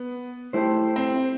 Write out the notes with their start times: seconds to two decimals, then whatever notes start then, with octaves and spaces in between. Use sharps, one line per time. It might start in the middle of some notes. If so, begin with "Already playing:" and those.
Already playing: B3
0.53 A3 E4 G4 C5
0.96 C4